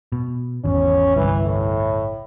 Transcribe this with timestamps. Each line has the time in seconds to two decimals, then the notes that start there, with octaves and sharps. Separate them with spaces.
0.12 B2
0.64 G#1 E2 C#4
1.16 G1 C2 E3
1.45 A2